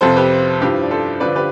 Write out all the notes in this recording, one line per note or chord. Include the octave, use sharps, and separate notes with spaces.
F2 C3 F3 A4 C5
G4 B4
G2 F3 E4 G4
D5
A4 C5
G2 D3 F3 B4 D5
G4 B4